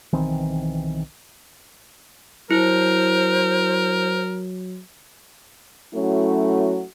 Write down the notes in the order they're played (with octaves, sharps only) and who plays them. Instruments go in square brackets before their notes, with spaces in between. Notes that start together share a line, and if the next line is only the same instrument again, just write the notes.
[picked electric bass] B1 D#3 E3 C4
[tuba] F#3 [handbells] E4 [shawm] A#4 [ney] C5
[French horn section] F#3 A3 C#4 E4 F#4